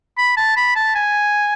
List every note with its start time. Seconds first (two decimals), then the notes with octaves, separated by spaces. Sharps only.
0.18 B5
0.37 A5
0.57 B5
0.76 A5
0.95 G#5